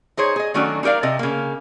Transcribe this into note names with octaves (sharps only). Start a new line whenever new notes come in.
D#4 G#4 C5 C#5
G#4 D#5
D#3 F#3 A3 C#4 D4 F#4
D#4 G4 A#4 D5 F5
C3 D#5 A5
C#3 A#3